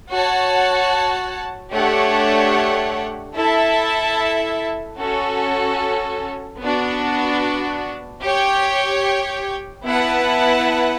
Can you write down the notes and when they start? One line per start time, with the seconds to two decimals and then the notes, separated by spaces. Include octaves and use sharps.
0.11 F#4 C#5 F#5 A5
1.73 A3 D4 G4 C#5 F#5
3.36 E4 A4 E5 A5
4.98 C#4 F#4 A4
6.60 B3 D4 F#4
8.22 G4 C#5 G5
9.84 B3 E4 B4 F#5 A5